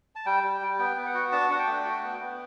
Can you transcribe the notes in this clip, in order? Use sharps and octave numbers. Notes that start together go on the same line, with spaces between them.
A5
G3 G5
G3
G3
B3 G5
B3
F#5
F#4
D4 A5
D4 F#5
G5
A3
F#4
B3
B3